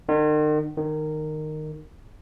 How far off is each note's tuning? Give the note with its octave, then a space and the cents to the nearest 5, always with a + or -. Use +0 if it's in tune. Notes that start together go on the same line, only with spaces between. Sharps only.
D#3 -40
D#3 -15